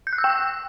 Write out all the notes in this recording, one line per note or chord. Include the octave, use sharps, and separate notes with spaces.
G6
F#6
E6
G5
E6